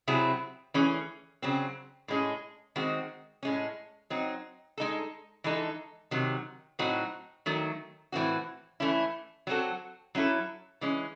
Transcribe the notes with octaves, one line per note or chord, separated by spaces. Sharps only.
C3 F#3 C4 E4 G#4
E3 A3 C#4 G#4
C#3 F#3 C4
A2 G#3 C#4 G#4
D#3 G#3 C4 F#4
A2 G#3 C#4
F#3 C4 D#4
G#3 D#4 A4
E3 G#3 D#4 A4
C3 D#3 F#3
A2 F#3 C4 D#4 F#4
D#3 F#3 A3
A2 E3 C4 F#4
E3 A3 C#4 E4
F#3 C4 F#4 A4
F#3 C#4 E4 A4
E3 G#3 C#4